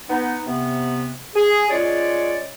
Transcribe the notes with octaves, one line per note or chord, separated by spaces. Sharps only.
B3 D#4
C3 B3
G#4
G#3 C#4 F4 C#5 D5